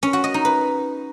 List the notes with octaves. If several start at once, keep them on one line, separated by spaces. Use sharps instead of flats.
C#4
F#4
D#5
D#4
B4